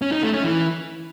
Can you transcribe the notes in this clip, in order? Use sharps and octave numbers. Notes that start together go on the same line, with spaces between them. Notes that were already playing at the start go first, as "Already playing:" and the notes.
C#4
D#4
A3
C#4
E3